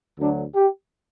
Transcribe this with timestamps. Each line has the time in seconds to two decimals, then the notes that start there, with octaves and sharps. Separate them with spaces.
0.19 D2 D3 F#3 D4
0.55 G4